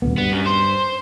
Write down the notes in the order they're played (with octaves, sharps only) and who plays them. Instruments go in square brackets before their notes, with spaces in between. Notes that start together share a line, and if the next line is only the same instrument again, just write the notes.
[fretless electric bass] D#1 D2 B3
[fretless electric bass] G2 [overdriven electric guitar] B3
[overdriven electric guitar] F#2
C5